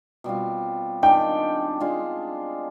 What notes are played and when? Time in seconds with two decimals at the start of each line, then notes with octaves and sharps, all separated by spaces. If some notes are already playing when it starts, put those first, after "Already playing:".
0.24 B2 G3 C4 F4
1.03 D#3 G#3 D4 G5
1.80 G#3 D4 F4 G#4